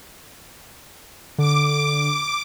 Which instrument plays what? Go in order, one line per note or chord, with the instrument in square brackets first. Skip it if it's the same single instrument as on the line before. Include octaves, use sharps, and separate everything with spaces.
[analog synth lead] D3 [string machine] D6